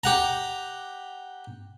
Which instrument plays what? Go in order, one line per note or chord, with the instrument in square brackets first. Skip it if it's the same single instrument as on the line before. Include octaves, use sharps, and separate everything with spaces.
[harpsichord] G4 F#5 A#5